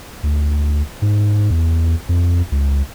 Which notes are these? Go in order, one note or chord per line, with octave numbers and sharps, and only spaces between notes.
D2
G#2
E2
F2
C#2